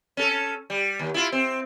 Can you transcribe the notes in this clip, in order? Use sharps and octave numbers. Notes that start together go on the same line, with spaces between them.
C#4 A4
G3
D#2
E4 F4
C4